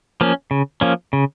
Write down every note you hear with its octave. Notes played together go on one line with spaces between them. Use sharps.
F3 A#3 C#4
C#3
F3 A#3 C#4
C#3